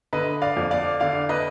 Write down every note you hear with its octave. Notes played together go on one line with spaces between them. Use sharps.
D3 B4 D#5
D5 F5
F2
D5 F5
D3 D5 F5
B4 D#5